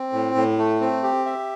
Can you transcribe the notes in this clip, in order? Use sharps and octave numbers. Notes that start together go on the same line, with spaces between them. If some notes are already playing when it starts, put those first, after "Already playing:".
Already playing: C4
A2
A2
A3
C4
G4
E5